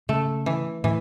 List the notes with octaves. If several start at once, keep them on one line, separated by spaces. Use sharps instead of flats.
C#3 A3
E3
A2 E3